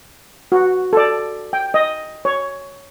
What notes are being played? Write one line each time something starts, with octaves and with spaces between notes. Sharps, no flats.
F#4
A4 D5
G5
D#5
C#5